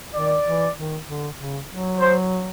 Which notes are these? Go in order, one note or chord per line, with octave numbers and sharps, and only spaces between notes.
D#3 D5
E3
D#3
D3
C#3
F#3
C5